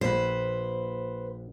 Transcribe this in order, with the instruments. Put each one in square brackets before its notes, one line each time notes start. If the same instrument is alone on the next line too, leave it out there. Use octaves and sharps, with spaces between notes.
[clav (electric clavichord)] A#1 [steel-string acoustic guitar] B4 C5